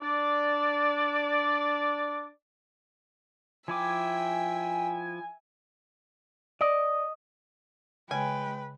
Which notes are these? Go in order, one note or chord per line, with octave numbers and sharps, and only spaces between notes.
D4 D5
F3 E4 E5 G5 G#5 D6
D5 D#5
C#3 G#3 B4 G5 G#5